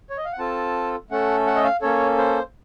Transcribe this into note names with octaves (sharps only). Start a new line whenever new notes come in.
C#5
D#5
F5
F#5
C4 F4 A4 A5
A3 C#4 A4 F#5
F#5
D#5
F5
A#3 C#4 A4 C#5
C5